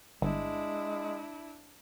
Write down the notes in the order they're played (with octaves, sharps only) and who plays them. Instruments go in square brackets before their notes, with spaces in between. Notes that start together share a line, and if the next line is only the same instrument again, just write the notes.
[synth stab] G1 [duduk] G#3 [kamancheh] D4 E4